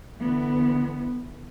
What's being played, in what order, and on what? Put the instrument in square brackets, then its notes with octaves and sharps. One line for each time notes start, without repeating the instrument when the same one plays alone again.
[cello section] D3 E3 B3